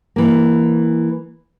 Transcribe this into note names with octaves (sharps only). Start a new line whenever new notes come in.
E3 A#3